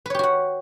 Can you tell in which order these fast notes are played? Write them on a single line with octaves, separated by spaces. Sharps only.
B4 C#5 G4 F#4 F#5